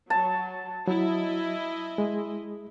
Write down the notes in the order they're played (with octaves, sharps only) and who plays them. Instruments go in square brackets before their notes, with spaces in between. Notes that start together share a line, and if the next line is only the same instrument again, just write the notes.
[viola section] F#3 [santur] A5
[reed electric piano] F#3 [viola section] E4 D#5
[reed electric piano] G#3